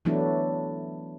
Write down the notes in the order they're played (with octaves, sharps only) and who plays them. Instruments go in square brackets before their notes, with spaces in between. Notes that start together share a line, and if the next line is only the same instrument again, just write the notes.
[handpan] E3 F#3 A3 B3 D4 E4